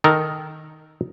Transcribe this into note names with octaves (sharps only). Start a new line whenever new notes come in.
D#3 A4 A#4